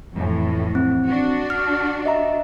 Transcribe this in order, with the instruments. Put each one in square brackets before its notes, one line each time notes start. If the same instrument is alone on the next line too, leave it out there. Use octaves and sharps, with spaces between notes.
[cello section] F2 A2 E3
[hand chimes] C4
[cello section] D4 F#4
[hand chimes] F6
D#5 E5 A#5